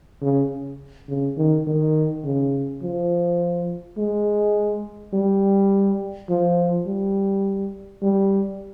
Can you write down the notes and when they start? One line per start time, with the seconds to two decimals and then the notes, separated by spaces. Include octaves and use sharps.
0.22 C#3
1.09 C#3
1.37 D#3
1.67 D#3
2.24 C#3
2.83 F3
3.98 G#3
5.13 G3
6.29 F3
6.87 G3
8.02 G3